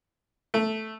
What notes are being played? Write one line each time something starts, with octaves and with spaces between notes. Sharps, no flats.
A3